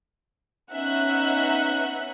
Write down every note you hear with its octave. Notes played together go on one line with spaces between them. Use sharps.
B3 C#4 D#4 E5 F#5 F#6